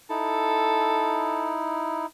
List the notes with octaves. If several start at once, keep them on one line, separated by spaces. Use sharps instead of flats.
D#4 E4 A4